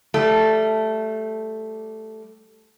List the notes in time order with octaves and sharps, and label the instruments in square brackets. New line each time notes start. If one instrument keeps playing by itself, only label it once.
[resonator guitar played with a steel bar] G3 A3